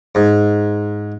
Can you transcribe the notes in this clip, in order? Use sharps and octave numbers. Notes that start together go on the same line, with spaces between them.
G#2